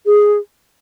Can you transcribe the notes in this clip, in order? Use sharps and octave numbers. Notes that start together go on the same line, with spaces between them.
G#4